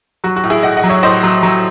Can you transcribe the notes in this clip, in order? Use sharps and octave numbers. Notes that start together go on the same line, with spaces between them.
F#3 F#4
F#4
A2
E4 G#4
A2 D#5 F#5
D#5 F#5
F#3
C#5 E5
A2 C5 D#5
F#3
F#3